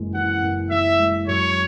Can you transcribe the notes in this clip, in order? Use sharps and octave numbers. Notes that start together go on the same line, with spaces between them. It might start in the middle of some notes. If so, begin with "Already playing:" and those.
Already playing: F#1 E3 G#3
E3 F#5
F#1
E3 E5
G#3
F#2 C#5